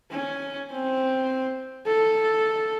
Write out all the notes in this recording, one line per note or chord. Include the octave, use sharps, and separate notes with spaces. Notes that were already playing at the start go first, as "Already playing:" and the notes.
C#4
C4
A4